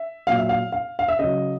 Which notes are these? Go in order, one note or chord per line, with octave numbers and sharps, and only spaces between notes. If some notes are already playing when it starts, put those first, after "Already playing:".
Already playing: E5
A#2 F#3 F5
E5
F5
F5
F5
E5
C#3 F#3 D#5